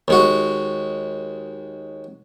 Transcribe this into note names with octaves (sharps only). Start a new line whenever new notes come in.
D#2 G#3 F#4